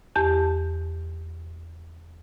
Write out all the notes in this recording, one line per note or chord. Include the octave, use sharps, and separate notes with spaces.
E2 G4 A5 G6